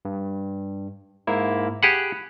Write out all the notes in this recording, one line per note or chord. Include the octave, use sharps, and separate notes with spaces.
G2
G#2 A#3 E4
G4 G#4 F#5 B5 F#6